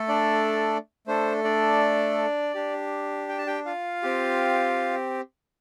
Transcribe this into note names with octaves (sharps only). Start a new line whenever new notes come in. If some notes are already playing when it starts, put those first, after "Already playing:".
Already playing: A3 A4
D4 D5
A3 D4 A4 C5
D4 D5
D4 G4
G5
A5
G4 G5
F4 F5
C4 G4